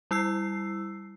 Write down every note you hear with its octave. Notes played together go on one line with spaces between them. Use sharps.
G3 E4 E6 C7